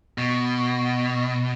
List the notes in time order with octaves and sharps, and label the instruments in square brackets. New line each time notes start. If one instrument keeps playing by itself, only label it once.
[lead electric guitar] B2